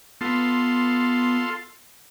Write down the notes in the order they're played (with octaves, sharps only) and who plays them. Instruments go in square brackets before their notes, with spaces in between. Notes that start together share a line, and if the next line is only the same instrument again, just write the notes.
[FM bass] B3 [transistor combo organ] F4 A4 C6